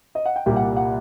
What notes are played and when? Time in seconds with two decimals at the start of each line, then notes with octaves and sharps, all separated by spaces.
0.15 D#5
0.26 F#5
0.36 G5
0.46 C2 A#2 G3 G5
0.56 F#5
0.77 F#5